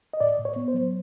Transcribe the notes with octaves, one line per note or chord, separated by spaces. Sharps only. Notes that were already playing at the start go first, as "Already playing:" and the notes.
D#5
A2 D5
A2
C#5
B3
C5
F#3